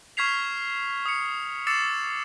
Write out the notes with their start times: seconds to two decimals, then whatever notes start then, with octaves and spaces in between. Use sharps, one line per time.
0.17 C#6 F6 G#6 B6 C7 F7
1.06 D#6 C#7
1.67 D6 E6 A6 C7 C#7 E7